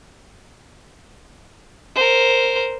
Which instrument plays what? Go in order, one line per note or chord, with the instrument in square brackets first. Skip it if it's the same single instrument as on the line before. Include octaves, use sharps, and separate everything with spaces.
[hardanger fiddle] A#4 C5